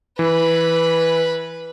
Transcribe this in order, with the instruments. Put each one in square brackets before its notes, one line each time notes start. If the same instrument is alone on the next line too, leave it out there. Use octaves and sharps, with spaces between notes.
[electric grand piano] E3 [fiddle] B4 B5